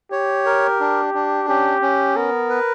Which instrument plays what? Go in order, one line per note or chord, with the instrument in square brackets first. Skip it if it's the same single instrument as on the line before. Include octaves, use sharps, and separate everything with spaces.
[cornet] G4 [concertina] C#5
[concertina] A#4
D4
D4
[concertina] C#4 [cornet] G4
[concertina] C#4
[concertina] B3 [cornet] A#4
[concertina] B4